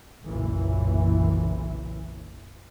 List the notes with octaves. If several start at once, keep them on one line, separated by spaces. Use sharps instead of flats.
F#1 B1 F#2 A#2 E3